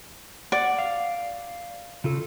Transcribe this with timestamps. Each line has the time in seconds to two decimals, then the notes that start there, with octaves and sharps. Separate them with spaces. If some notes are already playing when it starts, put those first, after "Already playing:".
0.52 D5 F#5
0.78 F5
2.04 C#3 F4 A4